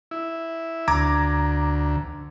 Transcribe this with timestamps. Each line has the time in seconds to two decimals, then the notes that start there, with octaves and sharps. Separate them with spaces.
0.11 E4
0.88 D2 A#5 D6 G#6